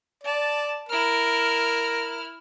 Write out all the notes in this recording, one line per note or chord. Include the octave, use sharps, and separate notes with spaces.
D5 A5
E4 A#4 F6